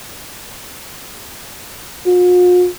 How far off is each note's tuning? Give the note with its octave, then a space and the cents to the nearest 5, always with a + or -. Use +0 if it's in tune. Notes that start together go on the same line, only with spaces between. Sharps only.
F4 +45